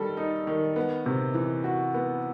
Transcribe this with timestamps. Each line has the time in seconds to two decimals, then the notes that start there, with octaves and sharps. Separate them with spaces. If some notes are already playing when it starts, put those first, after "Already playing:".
Already playing: D#3 G3 A4
0.17 D#4
0.47 D#3
0.76 B3
1.06 C3
1.35 E3
1.64 F#4
1.94 B3